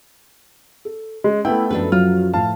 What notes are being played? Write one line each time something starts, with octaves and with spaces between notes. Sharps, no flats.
A4
G#3 C#4
A3 B3 E4 G5
F#2 F3 D4 A4 B4
F#3 F4 F6
A2 F3 F5 A5